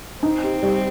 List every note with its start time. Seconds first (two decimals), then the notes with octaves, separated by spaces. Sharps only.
0.23 C4 D#4
0.44 G4
0.63 G3